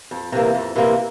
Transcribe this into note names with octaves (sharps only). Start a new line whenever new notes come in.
F2
C3 E3 A#3
F2
C3 E3 A#3